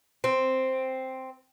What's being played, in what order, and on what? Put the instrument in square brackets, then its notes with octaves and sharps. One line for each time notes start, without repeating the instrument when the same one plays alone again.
[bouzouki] C4